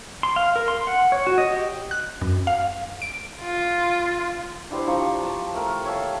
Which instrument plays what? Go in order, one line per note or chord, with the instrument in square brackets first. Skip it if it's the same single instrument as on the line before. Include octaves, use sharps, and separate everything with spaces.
[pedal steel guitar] C6
F5
A#4
C6
F#5
C#5
F#4
D#5
G4
[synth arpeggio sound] F#6
F#2
F5
D7
[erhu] F4
[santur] D4 E4 G4 C5
F3 A#5 C#6
A5
A3 A#4 G5
C#5 E5 F5 A5